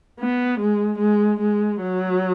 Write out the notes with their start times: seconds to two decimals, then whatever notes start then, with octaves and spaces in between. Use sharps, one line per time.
0.19 B3
0.60 G#3
0.99 G#3
1.40 G#3
1.81 F#3